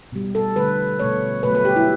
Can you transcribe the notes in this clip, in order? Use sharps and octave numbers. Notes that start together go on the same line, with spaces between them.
B2 G3
A4
D3 A3 B4
B2 A3 C#5
B2 F#3 A3 B4
B4
G4
E4